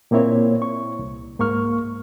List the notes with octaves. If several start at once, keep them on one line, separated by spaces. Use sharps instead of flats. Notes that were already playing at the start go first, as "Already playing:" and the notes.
A#2 A#3 C4 E4 C#5
C#6
C2
G#2 A#3 C#6 F6